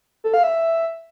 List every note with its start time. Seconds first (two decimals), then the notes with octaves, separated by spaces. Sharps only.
0.24 A4
0.34 F5
0.43 E5